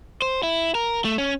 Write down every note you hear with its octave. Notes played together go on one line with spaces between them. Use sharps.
C5
E4
A#4
A3
C#4